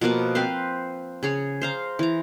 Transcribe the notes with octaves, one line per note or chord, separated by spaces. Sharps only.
B2 F3 A#3 B3
C4 B4 C5 F5
C#3 G#4 C#5
C5 F5 A#5
E3 A#5